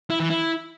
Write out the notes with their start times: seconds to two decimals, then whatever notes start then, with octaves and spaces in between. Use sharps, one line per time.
0.10 E4
0.20 E3
0.30 E4